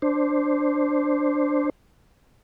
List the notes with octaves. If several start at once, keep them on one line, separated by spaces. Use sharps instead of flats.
D4 C5